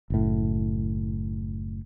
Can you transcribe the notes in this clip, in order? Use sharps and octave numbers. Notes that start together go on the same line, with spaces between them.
F#1 A2